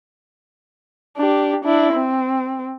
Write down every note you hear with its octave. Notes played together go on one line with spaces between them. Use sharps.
D4 G4
D4 E4
C4